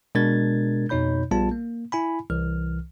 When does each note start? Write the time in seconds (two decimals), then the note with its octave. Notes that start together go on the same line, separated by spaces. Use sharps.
0.15 B2 G#3 D4 A#4 G#6 A6
0.89 F2 B2 D#4 C#5 B5 G6
1.31 A#1 G3 B3 F4 A5
1.51 A#3
1.92 E4 G#5 B5
2.30 C2 E3 F6